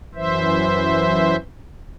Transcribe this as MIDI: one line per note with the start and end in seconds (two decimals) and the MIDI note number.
0.15 1.36 42
0.15 1.36 52
0.15 1.36 72
0.15 1.36 76